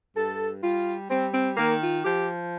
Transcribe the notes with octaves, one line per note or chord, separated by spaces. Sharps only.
G2 A4
G3 F4
G3 C4
C4
D#3 A#3
F4
F3 G4